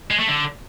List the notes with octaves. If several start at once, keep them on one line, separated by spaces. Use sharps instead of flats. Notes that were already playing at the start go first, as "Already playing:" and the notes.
G#3
A3
D3